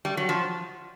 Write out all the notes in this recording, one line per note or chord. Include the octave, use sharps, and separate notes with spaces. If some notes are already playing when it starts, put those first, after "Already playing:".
G3
F#3
F3